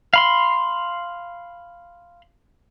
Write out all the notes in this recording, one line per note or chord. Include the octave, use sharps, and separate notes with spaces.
F5 B5 C6